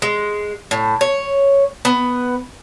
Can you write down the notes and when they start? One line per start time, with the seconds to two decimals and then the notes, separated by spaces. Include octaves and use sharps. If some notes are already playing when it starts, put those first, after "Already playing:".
0.02 G#3
0.71 A2
1.01 C#5
1.85 B3